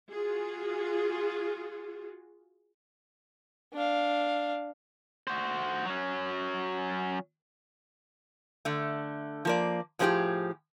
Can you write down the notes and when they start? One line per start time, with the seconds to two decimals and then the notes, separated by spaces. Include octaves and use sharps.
0.10 F4 F#4 G#4
3.73 D4 F5
5.27 F#4 C5
5.86 F#3 C#4
8.65 D3 A3
9.45 F3 A#3 D5
9.99 A2 F3 G#3 C4 G4 G#4